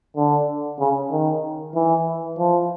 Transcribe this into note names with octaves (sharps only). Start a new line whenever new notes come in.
D3
C#3
D#3
E3
F3